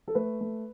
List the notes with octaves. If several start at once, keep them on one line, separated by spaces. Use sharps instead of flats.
A4
A3 B4
A3